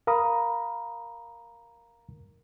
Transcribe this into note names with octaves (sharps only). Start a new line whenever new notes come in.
A#4 F5 A#5 B5 D#6